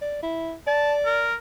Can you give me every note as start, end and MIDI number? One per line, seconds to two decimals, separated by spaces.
0.01 0.21 74
0.23 0.53 64
0.67 1.28 74
0.67 0.94 81
1.05 1.34 70